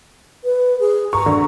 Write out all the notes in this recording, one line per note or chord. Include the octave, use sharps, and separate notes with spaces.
B4
G#4
A#5 C#6
D3